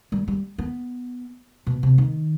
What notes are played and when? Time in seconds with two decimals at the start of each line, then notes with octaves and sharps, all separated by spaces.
0.12 G3
0.28 G3
0.58 B3
1.67 B2
1.83 C3
1.98 D#3